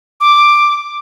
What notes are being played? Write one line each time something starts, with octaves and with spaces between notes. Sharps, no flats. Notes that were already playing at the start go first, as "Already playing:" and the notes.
D6